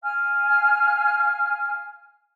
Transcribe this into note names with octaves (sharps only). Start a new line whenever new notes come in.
F5 G#5 F6